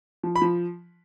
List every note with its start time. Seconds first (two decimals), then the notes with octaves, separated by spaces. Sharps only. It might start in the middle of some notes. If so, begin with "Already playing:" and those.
0.23 F3
0.36 B5
0.41 F3